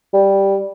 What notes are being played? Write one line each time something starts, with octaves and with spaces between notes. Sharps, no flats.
G3